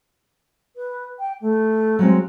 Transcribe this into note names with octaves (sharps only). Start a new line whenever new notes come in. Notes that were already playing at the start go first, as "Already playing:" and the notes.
B4
G5
A3
F#3 G#3 C4 F4